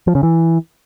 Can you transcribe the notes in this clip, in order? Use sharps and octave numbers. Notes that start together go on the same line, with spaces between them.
F3
C#3
E3